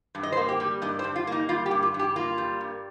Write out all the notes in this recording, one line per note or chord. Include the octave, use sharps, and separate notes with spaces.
G2
D#5
C5
A#3
G4
G3
G2 D#5
C5
G2
F4
A#3 D#4
G3 F4
G4
G2
F4
G2
G4
A#3 F4
G3
G2